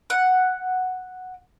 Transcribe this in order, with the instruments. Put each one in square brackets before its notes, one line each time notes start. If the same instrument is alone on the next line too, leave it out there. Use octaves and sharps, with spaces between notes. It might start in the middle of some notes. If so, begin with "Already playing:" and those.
[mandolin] F#5